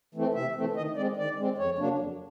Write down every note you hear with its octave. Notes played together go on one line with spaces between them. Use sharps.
E3 A3 C4
C3 E5
E3 A3 C4
D#3 D#5
G#3 C4 D5
D#3 D5
G#3 C4
F2 C#5
C#3 F#3 A#3 D4
F2